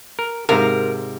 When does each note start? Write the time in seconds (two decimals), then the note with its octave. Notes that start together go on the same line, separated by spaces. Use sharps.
0.19 A#4
0.49 G#2 C3 A#4 F5